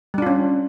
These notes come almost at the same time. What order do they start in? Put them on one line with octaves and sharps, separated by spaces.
G3 D4 F4 C#4